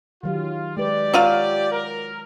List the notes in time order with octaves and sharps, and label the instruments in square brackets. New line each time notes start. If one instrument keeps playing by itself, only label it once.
[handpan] D#3 F#3 G4 [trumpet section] F4
[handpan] G#3 B4 [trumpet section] G4 D5
[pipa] F#3 F4 F5
[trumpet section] A#4